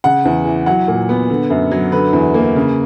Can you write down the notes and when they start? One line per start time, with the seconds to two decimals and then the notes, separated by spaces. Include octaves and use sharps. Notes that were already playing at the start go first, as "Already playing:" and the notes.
0.04 C#3 F#5
0.25 E2
0.46 E3
0.66 F#3 F#5
0.88 A#2
1.09 B3
1.30 D3
1.50 F#2
1.71 F#3
1.92 D3 B4
2.13 E2
2.34 A#3
2.56 C#3